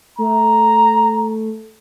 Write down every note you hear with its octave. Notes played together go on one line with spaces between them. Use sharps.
A3 A#5